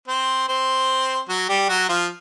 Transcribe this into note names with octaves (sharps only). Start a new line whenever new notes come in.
C4 C5
C4 C5
F#3 F#4
G3 G4
F#3 F#4
F3 F4